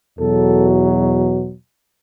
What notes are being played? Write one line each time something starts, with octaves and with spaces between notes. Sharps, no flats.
E2 B2 F#3 A4